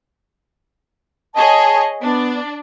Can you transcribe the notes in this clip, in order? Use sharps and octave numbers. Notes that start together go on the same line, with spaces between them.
G#4 C#5 D#5 A5
B3 D4